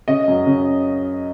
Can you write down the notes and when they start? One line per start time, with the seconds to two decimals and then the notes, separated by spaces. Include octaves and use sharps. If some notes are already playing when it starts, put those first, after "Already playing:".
0.08 C#3 D#5
0.28 F#2
0.46 C#3